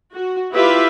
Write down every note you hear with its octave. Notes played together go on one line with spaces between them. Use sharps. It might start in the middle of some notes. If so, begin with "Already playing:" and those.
F#4
E4 F4 G4 B4 E5 F5